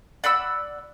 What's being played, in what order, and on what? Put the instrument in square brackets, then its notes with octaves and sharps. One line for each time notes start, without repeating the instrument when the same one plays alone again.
[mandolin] D5 F#5 B5 E6